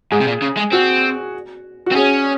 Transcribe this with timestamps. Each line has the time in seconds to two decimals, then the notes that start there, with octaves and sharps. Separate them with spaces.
0.12 G#2 G#4
0.20 C3
0.27 A#2
0.42 C#3
0.57 G#3
0.72 C4 F#4
1.86 F#4
1.91 C4
1.95 C#4 G#4